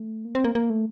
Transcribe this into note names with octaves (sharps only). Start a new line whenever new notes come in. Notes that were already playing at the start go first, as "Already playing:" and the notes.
Already playing: A3
A#3
C4
A#3
A#3
A3